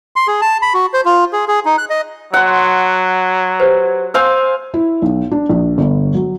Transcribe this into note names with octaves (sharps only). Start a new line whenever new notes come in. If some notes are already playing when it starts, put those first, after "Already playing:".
C6
G#4
A5
B5
F#4
C5
F4
G#4
G#4
D#4
F#6
D#5
F#3 F#5 C6
G4 B4 C5
C5 F5 G#5 E6 G6
E4
B1
D4
A#1
G1
F#3